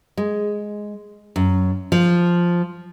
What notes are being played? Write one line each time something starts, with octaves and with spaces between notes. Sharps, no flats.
G#3
F#2
F3